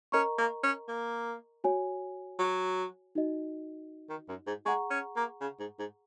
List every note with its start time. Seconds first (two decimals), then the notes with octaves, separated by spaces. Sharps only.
0.12 C#4 A#4 D#5 A#5 C#6
0.38 A#3
0.63 C#4
0.88 A#3
1.64 F#4 C#5 G#5
2.39 F#3
3.15 D#4 F#4 D#5
4.09 D#3
4.28 F#2
4.47 G#2
4.66 G#3 G#4 F#5 A#5 C#6
4.91 C#4
5.16 A#3
5.41 C#3
5.60 G#2
5.79 G#2